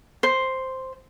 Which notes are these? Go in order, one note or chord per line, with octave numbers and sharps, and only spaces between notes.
C5